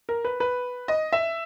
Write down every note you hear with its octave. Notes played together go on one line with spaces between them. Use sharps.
A#4
B4
B4
D#5
E5